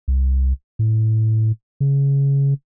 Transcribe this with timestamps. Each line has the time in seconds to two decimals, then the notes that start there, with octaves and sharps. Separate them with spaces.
0.08 C2
0.79 A2
1.80 C#3